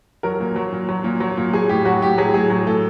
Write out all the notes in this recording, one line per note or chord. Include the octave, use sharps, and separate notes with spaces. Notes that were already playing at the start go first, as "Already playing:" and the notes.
F#3 A#4
A#2
F#3
A#2
F#3
A#2
F#3
A#2
F#3 G#4
A2 G4
F#3 F#4
A2 G4
F#3 G#4
A2 G#4
F#3
A2 A4